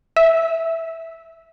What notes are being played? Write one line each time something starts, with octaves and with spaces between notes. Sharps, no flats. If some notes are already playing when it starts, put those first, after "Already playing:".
E5